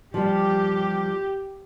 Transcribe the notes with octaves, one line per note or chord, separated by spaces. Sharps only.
F3 G3 G4